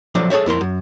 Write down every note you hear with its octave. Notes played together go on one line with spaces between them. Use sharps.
F3 F#3 A3 D4
G#4 A4 C5 C#5 E5
F2 E4 A#4 C6
F#2